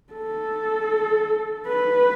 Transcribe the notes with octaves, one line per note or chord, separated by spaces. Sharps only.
A4
B4